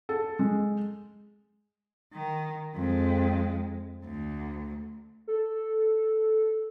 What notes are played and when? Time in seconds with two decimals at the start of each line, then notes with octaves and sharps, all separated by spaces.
0.09 A4
0.39 G#3
2.13 D#3
2.76 F2 G#3
4.05 D2
5.27 A4